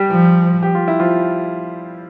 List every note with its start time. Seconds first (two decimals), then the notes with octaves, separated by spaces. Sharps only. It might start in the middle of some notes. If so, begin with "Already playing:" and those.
Already playing: G3 G4
0.10 F3
0.63 G4
0.75 F4
0.88 E4
1.00 F3 F4